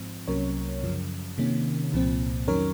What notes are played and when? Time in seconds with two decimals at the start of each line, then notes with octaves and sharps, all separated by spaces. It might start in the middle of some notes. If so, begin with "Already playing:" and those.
Already playing: G#2 F3 C4
0.28 C2 C3 F#3 A#3 C#4 A#4 C#5
0.83 F#2 C#3 F3
1.38 C3 D#3 A#3 C#4
1.93 C2 A#2 F3 C4
2.48 F2 D#3 F#3 C#4 A#4 C#5